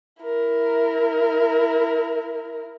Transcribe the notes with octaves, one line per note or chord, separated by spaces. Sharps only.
E4 A#4